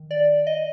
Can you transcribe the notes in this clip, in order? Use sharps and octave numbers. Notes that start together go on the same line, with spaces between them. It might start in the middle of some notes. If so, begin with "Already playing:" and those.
Already playing: D#3
D5
D#5